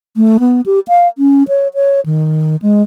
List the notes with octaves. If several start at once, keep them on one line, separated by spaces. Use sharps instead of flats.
A3
B3
G4
F5
C#4
C#5
C#5
D#3
G#3